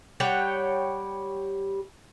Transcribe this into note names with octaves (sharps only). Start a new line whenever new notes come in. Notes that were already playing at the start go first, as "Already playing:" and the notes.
G3 C#5 F#5 G5